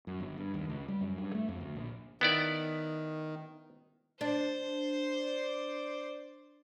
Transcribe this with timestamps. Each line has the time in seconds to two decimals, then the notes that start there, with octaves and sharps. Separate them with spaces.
0.07 F#2
0.20 G1
0.38 G2
0.54 D#2
0.69 C#2
0.88 G3
1.01 F#2
1.18 G2
1.35 A3
1.49 F2
1.60 D2
1.76 A#1
2.21 D#3 B3 E4 D5
4.21 D4 C5
5.10 D5